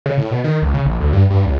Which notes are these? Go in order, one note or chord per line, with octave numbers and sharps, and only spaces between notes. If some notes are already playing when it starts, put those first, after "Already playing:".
C#3
A2
B2
D#3
C#2
C#3
A#1
D2
G2
G2
C#2